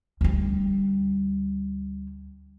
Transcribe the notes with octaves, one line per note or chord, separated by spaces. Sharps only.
D2 G3